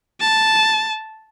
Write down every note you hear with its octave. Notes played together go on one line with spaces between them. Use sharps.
A5